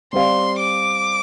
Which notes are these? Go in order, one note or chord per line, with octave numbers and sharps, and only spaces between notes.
G3 C4 G4 D5 F5 C6
D6